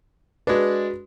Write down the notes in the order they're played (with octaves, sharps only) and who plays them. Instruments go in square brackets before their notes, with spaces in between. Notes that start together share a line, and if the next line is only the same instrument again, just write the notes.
[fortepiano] G#3 D4 [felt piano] F#4 B4